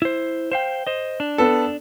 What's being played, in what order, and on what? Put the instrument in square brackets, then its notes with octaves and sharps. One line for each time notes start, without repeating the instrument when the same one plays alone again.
[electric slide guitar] E4 C5
C5 F5 G5
C5 D#5
D4
[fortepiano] B3 A4